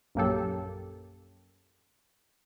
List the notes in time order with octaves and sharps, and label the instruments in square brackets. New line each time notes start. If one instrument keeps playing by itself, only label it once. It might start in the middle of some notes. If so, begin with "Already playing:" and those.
[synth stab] A#1 F#2 A#3 C#4 G4 A4